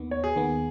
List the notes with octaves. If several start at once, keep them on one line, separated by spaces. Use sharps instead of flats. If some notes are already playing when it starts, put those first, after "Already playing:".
Already playing: D#2 D#3 B3
C#5
G#4
D#2 D#3 B3